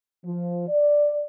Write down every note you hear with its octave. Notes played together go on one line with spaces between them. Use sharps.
F3
D5